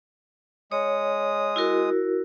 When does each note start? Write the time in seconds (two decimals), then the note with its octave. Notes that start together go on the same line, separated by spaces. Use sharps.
0.72 G#3 C#5 D#6
1.56 E4 F#4 A#4